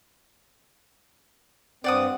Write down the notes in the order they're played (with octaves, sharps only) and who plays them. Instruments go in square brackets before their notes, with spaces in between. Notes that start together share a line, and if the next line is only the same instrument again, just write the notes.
[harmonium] G2 C4 [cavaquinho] D5 F#5 D#6